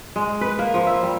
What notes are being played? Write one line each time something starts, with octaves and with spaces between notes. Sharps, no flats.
G#3
B4
A#3
F3
E5
G3